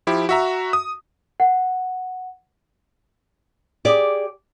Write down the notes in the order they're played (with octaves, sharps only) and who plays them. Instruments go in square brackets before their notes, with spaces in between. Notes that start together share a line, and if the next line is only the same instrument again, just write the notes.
[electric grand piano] F3 E4 G4
F#4 E5 A#5
D#6
[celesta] F#5
[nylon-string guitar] G4 G#4 D5